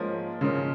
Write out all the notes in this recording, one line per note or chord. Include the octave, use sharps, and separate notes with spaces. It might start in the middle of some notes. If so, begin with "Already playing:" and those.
Already playing: G#2 F3 A#3 C#4
G#2 C#3 F3 A#3 C#4